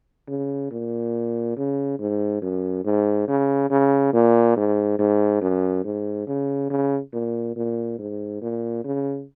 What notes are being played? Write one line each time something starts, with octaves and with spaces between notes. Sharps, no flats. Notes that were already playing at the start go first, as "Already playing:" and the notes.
C#3
A#2
C#3
G#2
F#2
G#2
C#3
C#3
A#2
G#2
G#2
F#2
G#2
C#3
C#3
A#2
A#2
G#2
A#2
C#3